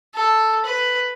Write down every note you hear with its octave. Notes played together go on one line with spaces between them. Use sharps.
A4
B4